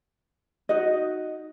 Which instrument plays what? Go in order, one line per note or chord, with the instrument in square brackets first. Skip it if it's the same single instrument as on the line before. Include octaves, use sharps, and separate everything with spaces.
[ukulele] D#4 F#4 D#5